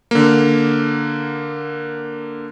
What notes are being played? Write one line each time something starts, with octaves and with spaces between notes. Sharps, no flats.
D3 A#3